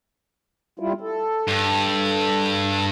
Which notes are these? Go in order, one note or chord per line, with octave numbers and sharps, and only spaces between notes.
G3 E4 F4
A4
G2